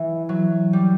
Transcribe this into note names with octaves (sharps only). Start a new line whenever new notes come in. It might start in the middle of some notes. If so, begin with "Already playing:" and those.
Already playing: E3
F#3
G3